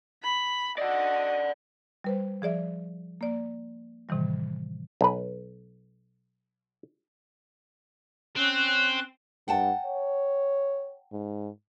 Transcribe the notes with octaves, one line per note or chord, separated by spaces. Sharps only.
B5
F#4 D5 D#5 F#5
G3 B4 C5
F3 G#4 D5 E5
A#3 D5
A2 C3 D#3 E3 G3
B1 B4
C4 C#4 F#6
G2 F#5 G5 A5
C#5
G#2